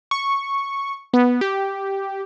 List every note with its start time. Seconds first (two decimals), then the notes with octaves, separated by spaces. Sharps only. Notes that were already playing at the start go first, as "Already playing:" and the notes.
0.11 C#6
1.14 B3
1.41 G4